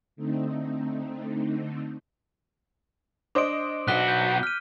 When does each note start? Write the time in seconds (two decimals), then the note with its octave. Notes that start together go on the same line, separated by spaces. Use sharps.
0.16 D3 A3 C4 D#4
3.35 D4 C5 D#5 D6 D7
3.88 B1 F#4 F#6 B6 G7
4.08 G6
4.43 F6 D#7